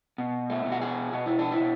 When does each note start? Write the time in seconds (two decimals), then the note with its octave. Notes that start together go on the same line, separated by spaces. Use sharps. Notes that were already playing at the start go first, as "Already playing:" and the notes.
0.18 B2
0.50 A3
0.65 B2
0.72 F#4
0.81 G#4
1.13 B2 F#4
1.26 E4
1.39 D4
1.52 E4
1.60 B2